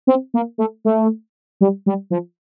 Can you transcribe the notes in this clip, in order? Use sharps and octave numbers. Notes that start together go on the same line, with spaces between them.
C4
A#3
A3
A3
G3
G3
F3